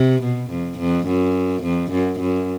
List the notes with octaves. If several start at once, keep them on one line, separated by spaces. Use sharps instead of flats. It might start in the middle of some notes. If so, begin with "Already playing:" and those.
Already playing: C3
B2
F2
F2
F#2
F2
F#2
F#2